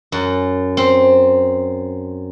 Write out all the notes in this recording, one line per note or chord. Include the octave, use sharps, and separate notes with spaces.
F#2
C4